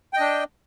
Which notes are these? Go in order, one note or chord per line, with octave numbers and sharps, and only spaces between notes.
D4 D#5 G5